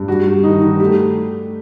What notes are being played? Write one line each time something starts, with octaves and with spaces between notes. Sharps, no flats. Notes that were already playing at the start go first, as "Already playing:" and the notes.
Already playing: G2
G3 F#4
G3
D#3 D#4
D#3
A3 G4